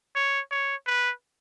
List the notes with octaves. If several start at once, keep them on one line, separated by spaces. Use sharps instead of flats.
C#5
C#5
B4